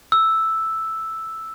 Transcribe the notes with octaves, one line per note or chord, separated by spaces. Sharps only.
E6